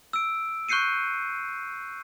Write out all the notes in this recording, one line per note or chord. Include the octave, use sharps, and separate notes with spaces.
E6 D7
C#6 F#6 G6 C7 C#7 D#7